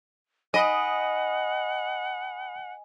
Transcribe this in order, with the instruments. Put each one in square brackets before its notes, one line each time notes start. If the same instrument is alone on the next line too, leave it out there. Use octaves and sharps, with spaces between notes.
[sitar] D#5 [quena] F#5 [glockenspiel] G#5 [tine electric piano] B5 D#6